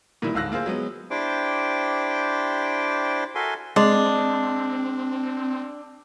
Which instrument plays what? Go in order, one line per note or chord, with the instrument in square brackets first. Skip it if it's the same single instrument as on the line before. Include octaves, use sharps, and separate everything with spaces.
[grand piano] A#2 D#3 E3 G3 E4
D1 G#2 F5 E6 F#6 A#6
A#3 F4 G#4 C5
F#3 G#3 B3
[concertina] D4 E4 G4 C5 G5 D6
F#4 A4 A#4 E5 G#5 C6
[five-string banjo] G#3 [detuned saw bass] C4 [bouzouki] D4